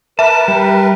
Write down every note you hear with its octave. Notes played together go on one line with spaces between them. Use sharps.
A#4 B4 E5 A5
G3